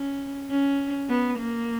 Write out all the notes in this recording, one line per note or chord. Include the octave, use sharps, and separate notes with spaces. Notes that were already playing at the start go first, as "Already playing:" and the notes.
Already playing: C#4
C#4
B3
A#3